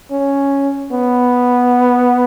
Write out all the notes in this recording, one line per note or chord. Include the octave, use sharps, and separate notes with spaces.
C#4
B3